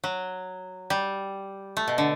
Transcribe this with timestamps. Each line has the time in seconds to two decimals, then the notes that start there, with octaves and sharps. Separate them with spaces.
0.04 F#3
0.90 G3
1.77 A3
1.88 B2
1.98 D3